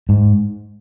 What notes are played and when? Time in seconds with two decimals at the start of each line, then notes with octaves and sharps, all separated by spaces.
0.09 G#2